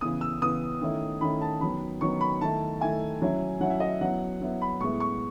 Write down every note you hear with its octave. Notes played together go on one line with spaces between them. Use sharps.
C#3 E3 B3 D#6
E6
C#3 E3 B3 D#6
D#3 A3 C#4 E4
D#3 A3 C#4 E4 B5
A5
D#3 F#3 B3 B5
D#3 F#3 B3 C#6
B5
D#3 A3 E4 A5
D#3 A3 E4 G#5
F#3 C#4 E4
F#3 C#4 E4 F#5
E5
D#5
E5
F#3 B3 E4 F#5
F#3 B3 E4
B5
A2 G#3 B3 E4 C#6
C#6